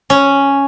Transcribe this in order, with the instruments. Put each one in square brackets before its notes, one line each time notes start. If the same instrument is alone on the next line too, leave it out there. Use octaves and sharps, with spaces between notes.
[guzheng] C#4